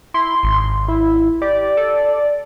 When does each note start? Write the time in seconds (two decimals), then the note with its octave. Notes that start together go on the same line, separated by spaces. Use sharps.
0.14 E4 C6
0.43 G#1
0.88 E4
1.42 G4 D5
1.77 A4